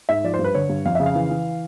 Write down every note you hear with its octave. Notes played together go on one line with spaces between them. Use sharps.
G#2 E5
F3 D5
C5
G2
B4
D3 C#5
G2
F2 F5
C#3 E5
F5
E3
E3